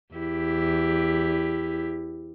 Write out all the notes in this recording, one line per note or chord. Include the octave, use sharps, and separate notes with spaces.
E2 E4 G4